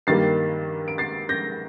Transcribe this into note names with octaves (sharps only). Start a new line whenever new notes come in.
G2 D#3 G3 A#3 A6 C7
D7
A6 C7
G6 A#6